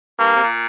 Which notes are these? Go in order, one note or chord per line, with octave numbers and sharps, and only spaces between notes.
G2 A#3
C3
A#2